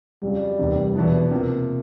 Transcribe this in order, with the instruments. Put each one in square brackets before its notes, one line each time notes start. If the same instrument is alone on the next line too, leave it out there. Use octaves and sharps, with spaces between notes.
[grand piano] F2 C#3 F#3 [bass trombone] G3
[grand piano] F1 E2 C3 D#3
[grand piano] E2 B2 F#3 B3 D4 [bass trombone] E3
[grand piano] C3 F3 A#3